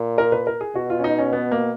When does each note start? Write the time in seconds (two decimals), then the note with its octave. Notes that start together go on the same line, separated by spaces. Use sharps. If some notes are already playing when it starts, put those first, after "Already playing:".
Already playing: A#2
0.18 A#4
0.32 B4
0.47 A#4
0.61 G#4
0.75 B2 F#4
0.90 F4
0.99 C#4
1.04 D#4
1.18 C#4
1.33 B3
1.51 A#3